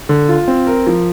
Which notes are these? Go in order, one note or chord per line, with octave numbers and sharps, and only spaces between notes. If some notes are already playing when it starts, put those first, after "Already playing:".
D3
F4
C4
A#4
F3